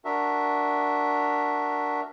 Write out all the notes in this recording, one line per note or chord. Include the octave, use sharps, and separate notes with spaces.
D4 F#4 A#4 E5